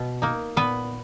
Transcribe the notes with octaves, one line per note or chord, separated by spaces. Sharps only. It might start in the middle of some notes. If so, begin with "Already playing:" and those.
Already playing: B2
A#3 D#4
A#2 B3 B4